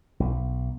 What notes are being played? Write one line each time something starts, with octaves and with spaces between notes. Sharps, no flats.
B1